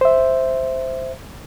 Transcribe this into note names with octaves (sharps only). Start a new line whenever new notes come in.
C5 E5